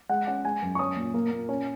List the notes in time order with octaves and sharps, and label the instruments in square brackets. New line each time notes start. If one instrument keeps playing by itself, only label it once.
[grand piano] G#3 F#5
C#4 F#5
G#3 G#5
F#2
C#6
C#4 D#6
A#2
A#3
A#2
C#4